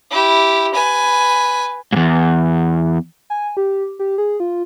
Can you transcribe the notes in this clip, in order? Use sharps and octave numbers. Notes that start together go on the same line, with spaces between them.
E4 G4
B4 G#5
E2 G#2
G#5
G4
G4
G#4
F4